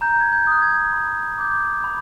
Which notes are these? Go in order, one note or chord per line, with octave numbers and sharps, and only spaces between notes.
A#5 G6
G#6
G6
D#6 F#6
G#6
B5
D6 G6
B5